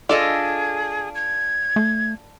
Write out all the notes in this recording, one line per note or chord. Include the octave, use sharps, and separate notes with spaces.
D4 F4 G#4 A4 D5 D#5
G#6
A3